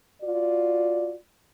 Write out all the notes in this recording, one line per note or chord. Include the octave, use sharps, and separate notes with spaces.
F4 F#4 D5